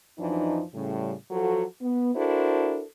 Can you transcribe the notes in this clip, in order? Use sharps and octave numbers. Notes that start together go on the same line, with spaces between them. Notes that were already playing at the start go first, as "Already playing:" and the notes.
F#2 E3 F3 D4 D#4
A2 C#3 G3
F3 F#3 F#4 A4
B3
D4 E4 F#4 A4 A#4 C5